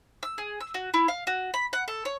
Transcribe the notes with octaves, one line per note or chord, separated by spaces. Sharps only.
E6
G#4
E6
F#4
E4
F5
F#4
B5
F#5
A4
C#5